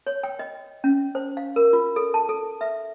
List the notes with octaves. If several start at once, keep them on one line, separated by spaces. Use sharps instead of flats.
C#5
G5
D#5
C#4
C5
F5
A#4
F4
A4
A5
A4
E5